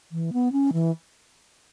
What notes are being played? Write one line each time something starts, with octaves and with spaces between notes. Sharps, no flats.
E3
B3
C#4
E3